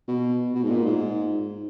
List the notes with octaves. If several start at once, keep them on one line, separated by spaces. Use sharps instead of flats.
B2
B2
G#2
A#2
G#2